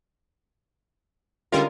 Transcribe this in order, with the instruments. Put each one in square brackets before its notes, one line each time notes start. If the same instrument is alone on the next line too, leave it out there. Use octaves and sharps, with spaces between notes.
[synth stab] D3 G3 A#4 [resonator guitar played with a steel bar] G#3 C#4 F4